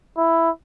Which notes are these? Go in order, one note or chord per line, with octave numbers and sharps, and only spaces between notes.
E4